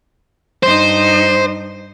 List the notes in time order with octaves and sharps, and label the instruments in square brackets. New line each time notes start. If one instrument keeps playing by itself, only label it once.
[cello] G2 D#4 [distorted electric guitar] C5